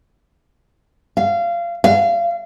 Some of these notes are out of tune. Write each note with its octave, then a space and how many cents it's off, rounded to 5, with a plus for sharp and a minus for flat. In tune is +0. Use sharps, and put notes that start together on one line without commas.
F5 -25
F5 -30